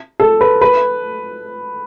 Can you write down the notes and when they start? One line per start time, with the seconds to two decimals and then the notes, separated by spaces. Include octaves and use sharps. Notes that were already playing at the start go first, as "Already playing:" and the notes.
0.20 A4
0.41 B4
0.61 B4